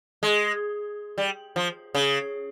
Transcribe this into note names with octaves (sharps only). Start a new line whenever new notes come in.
G#3
G3
F3
C#3